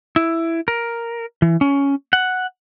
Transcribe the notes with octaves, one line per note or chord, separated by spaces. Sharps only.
E4
A#4
E3
C#4
F#5